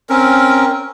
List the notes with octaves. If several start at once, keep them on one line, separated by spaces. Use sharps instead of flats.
C4 C#4 A#4